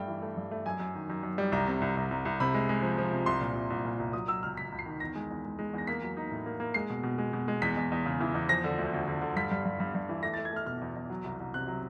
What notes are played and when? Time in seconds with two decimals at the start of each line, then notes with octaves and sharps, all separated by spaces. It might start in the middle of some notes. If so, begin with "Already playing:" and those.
Already playing: G2 A3 G5
0.08 E3
0.22 A3
0.37 G2
0.51 A3
0.66 F#2 G#5
0.80 F#2
0.95 D#3
1.10 F#2
1.23 F#2
1.38 G3
1.52 C2 A#5
1.67 C3
1.82 C2
1.97 C2
2.11 C2
2.25 C2
2.40 C3 B5
2.54 G#3
2.69 G#3
2.83 F3
2.98 F3
3.12 C3
3.26 C2 C6
3.41 A#2
3.56 C2
3.70 C2
3.85 A#2
4.00 C2
4.13 F#3 D#6
4.28 F#3 E6
4.43 C#2 F6
4.57 C#2 B6
4.72 C#2
4.79 C7
4.86 D#3
5.00 E2 A#6
5.16 G#3
5.30 E2
5.45 G#3
5.59 G#3
5.73 E2 A#6
5.87 A#3 B6
6.03 F#3
6.17 D#4
6.31 A2
6.46 A#3
6.60 A#3
6.74 G#3 C7
6.90 B2
7.03 B2
7.18 G#3
7.33 B2
7.48 G#3
7.62 E2 B6
7.77 E2
7.92 E2
8.06 C#3
8.21 E3
8.34 E2
8.49 F3 A#6
8.64 D3
8.78 D2
8.93 D2
9.08 D3
9.22 D3
9.36 G2 B6
9.51 G2
9.65 G2
9.80 G2
9.95 G2
10.09 E3
10.23 A3 A#6
10.34 A6
10.38 A3
10.45 G#6
10.52 A3 F6
10.66 B2 F6
10.81 E2
10.96 E2
11.10 F#3
11.24 C2
11.40 C2
11.54 C3 F#6
11.68 F#3